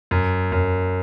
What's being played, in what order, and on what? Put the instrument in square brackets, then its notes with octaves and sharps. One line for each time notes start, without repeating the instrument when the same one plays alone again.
[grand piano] F#2
F#2